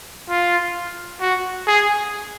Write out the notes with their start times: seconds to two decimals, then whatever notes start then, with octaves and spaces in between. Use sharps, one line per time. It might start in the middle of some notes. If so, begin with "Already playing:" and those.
0.29 F4
1.21 F#4
1.67 G#4